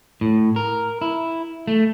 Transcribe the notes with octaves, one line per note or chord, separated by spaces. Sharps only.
A2
A#4
E4
A3